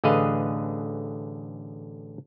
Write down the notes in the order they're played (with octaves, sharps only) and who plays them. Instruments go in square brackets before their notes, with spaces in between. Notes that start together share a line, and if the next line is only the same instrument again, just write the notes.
[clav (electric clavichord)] A1 D3 G#4 B4 D#5 F5